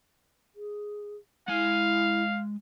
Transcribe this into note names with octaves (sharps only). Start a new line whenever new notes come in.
G#4
G#3 E4 F5 G#5